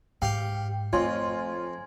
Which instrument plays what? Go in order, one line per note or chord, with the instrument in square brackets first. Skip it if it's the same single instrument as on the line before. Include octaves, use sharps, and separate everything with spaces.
[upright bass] G#2 [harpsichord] G4 F5 [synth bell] G5
[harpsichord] F2 [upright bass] A3 [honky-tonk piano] F4 C#5 [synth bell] G#5 C6 G#6